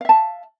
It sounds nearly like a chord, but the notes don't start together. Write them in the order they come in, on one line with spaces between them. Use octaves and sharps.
F5 E5 A5